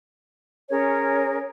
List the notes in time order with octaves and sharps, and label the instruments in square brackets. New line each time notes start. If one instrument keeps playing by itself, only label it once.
[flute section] C#4 G#4 A#4 C#5